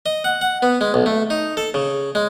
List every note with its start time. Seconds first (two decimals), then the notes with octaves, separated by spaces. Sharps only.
0.06 D#5
0.24 F#5
0.41 F#5
0.62 B3
0.81 G#3
0.94 B1
1.06 A3
1.30 D#4
1.57 A4
1.74 C#3
2.15 G#3